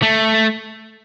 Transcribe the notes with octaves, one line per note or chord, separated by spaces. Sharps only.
A3